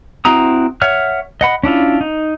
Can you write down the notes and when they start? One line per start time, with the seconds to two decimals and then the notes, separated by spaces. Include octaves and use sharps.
0.25 C4 E4 F#4 A#5 D#6
0.82 C#5 E5 F#5 F6
1.41 D#5 F#5 B5
1.63 C#4 D4 E4 F4
2.01 D#4